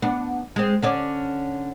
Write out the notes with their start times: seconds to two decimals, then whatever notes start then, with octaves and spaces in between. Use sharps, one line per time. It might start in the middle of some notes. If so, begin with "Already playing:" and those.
0.02 B3 D4
0.56 G#3 C4
0.82 D3 C#4 D5